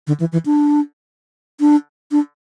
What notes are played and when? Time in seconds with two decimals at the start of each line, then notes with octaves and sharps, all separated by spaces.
0.07 D3
0.20 E3
0.32 E3
0.46 D4
1.60 D4
2.12 D4